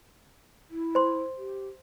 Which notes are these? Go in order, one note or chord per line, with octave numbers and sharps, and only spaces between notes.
E4
C5 C6
G4